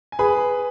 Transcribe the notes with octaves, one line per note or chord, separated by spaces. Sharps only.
G#5
G#4 B4 B5